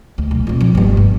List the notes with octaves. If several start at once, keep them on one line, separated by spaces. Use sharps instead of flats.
D2
B1
A#2 C4
F3
G1 G2
G2